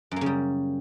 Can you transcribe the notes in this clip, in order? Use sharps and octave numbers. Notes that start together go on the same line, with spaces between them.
F#2 C#3 G3 A#3